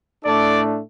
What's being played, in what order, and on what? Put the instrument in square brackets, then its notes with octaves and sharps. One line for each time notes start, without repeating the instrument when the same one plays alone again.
[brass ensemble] A2 A3 D4 A4 D5